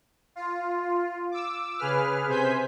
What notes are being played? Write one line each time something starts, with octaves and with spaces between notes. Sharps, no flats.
F4
D6 E6
C#3 G#4 B4 F6
C3 C5 G#5 G6 B6